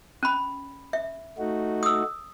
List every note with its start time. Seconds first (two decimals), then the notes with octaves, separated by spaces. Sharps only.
0.23 C#4 B5
0.93 E5
1.38 A3 D#4 F#4
1.83 D#6 E6